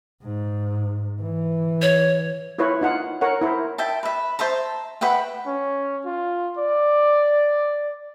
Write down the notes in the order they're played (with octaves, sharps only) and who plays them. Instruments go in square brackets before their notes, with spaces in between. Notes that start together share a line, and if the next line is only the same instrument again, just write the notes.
[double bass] G#2
E3
[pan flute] C#5
[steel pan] E4 F4 B4 C#5
D#4 F4 F#5
A#4 C#5 F#5
E4 A#4 C5
[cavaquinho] E5 G5 A5
B4 E5
C5 E5 A5 A#5
B4 E5 F#5 G5
[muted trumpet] C#4
F4
D5